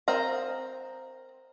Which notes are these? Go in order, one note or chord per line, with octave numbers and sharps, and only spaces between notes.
C4 A#4 D#5 F5 A#5